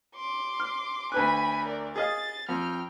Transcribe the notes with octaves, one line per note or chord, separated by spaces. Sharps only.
C6 D6
F6
D2 B4 G#5 B5 F#6
A#4 D5
G#4 D#5 F5 A6
F2 G5 F6